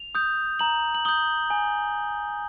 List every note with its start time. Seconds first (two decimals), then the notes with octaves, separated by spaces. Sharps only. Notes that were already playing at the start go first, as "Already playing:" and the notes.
Already playing: F7
0.15 D#6 G6
0.59 A#5 F#7
0.95 F#7
1.05 D#6 G6 G7
1.50 G#5